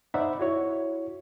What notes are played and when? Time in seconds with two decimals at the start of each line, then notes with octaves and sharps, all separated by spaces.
0.14 D#4 C5 D5 E5 F#5 B5
0.40 E4 F#4 C#5